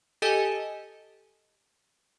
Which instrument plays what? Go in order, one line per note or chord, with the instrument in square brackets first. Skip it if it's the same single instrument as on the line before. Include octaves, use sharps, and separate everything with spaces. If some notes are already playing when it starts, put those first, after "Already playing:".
[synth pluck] G4 A4 D#5 G#5